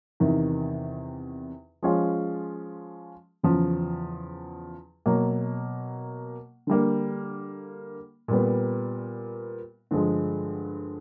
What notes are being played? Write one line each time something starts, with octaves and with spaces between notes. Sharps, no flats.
E2 C3 D#3
F3 G#3 C#4 F4
E2 C#3 F3
B2 F#3 A#3
D3 G3 A#3
A#2 G3 B3
G2 D3 F3 G#3